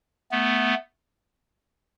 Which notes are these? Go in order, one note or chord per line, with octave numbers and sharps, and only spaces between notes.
A3 B3